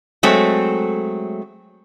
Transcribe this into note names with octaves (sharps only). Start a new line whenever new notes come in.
F#3 G#3 A3 C4 A4 C#5